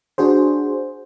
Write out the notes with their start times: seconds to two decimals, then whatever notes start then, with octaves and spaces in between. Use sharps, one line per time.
0.18 D4 F#4 G#4 C5